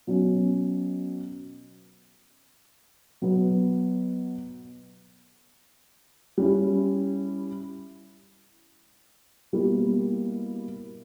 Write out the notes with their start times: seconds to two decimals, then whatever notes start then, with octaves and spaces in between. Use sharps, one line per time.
0.07 B2 F#3 C#4
3.22 B2 F#3 B3
6.38 G3 C#4 E4
9.53 B2 G3 A#3 E4